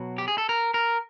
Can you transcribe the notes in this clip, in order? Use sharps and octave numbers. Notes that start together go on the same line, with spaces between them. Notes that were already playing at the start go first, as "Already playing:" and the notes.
Already playing: B2 F#3
G4
G#4
A4
A#4
A#4